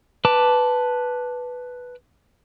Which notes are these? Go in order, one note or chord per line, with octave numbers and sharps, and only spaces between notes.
B4 A5 D6